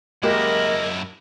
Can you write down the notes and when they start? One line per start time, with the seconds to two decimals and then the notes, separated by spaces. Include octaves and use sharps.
0.23 F#2 G#3 A#3 E4 G4 A#4 D#5